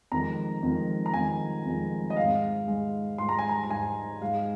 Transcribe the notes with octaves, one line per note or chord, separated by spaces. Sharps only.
F2 D#3 G#3 A#5
F2 D#3 G#3
A#5
F2 D#3 G#3 G#5
F2 D#3 G#3
D#5
G#2 G#3 F5
G#2 G#3
G#2 G#3 C6
A#5
G#5
A#5
A#5
G#2 G#3 G#5
G#2 G#3 F5